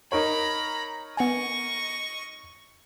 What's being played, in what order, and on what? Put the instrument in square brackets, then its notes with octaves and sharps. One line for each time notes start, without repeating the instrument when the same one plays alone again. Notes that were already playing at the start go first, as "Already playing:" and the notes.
[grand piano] D#4 A#4 C#5 [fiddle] A#5 B5
[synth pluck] B3 G#5 [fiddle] D#5 C#6